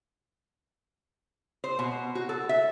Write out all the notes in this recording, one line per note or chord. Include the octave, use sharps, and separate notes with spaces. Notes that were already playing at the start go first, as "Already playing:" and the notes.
C5
B2
F#4
A4
E5